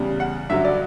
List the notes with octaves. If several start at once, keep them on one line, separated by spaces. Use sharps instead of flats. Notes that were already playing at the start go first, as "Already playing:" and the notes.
Already playing: E2 C#3 G3
F#5
G2 D3 F#3 E5
D5